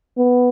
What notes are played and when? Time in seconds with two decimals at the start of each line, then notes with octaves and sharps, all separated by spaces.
0.17 B3